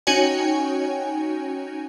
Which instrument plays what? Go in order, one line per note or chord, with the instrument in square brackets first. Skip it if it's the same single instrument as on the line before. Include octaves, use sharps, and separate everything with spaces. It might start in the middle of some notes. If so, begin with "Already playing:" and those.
[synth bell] C#4 D#4 F#4 C#5 G5 G#5